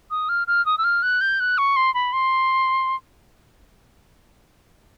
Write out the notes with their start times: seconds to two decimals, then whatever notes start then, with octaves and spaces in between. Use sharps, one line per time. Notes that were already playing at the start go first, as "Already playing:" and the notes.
0.11 D#6
0.29 F6
0.47 F6
0.66 D#6
0.78 E6
0.84 F6
1.02 F#6
1.21 G6
1.40 F#6
1.58 C#6
1.76 C6
1.94 B5
2.13 C6